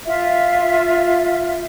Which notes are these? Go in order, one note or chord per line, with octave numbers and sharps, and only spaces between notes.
F4 E5